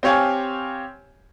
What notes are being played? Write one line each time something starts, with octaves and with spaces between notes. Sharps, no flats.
C4 G4 C#5 F5 G#5